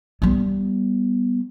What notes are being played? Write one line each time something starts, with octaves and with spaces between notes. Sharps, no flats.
G3 B3